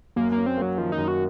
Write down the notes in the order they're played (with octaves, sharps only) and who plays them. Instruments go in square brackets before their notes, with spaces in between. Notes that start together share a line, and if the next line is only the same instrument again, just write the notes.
[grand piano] F#2 [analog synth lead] A#3
[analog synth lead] A#3
[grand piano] C#4
[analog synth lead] C4
[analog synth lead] F#3 [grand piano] A#3
[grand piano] D#3 [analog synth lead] F3
[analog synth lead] D#4
[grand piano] F#2
[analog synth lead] F#4